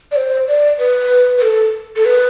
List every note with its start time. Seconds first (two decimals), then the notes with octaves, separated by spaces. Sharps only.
0.11 D5
0.16 C5
0.47 D5
0.79 B4
1.38 B4
1.42 A4
1.96 A4
2.06 B4